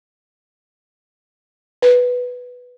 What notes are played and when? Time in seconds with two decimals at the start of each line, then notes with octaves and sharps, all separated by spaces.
1.82 B4